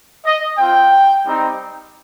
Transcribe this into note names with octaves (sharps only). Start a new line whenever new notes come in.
D#5
C4 F4 G5
G3 C4 D#4